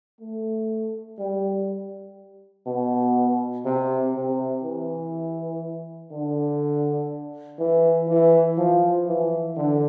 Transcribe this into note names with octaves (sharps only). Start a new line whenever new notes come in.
A3
G3
B2
C3
C3
E3
D3
E3
E3
F3
E3
D3